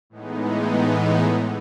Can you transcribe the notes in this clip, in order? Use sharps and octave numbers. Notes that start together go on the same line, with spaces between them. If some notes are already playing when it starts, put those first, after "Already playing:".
A2 E3 G#3 B3 D#4
D#5 F#5
C#5 E5
C#5 E5